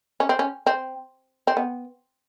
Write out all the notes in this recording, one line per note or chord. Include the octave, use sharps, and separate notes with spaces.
C#4
C4
C#4
C4
C4
B3